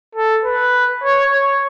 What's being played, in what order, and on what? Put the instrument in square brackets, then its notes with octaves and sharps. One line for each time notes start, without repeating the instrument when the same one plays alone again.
[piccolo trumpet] A4
B4
C#5
C#5